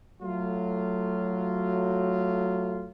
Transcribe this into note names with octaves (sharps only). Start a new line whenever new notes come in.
F#3 A3 F4